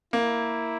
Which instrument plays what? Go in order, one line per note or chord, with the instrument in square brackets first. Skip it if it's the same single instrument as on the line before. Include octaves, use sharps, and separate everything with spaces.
[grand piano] A#3 [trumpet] E4